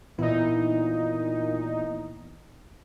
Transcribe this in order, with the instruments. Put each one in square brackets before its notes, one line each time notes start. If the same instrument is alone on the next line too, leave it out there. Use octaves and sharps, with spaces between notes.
[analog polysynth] A#2 D#4 [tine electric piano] E3 B3 E4